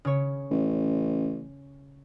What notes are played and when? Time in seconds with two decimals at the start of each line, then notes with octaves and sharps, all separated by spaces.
0.05 C#3 C#5
0.50 A1